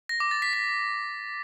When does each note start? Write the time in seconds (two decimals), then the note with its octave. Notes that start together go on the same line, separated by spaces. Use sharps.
0.09 A#6
0.20 D6
0.31 A6
0.42 B6
0.53 B6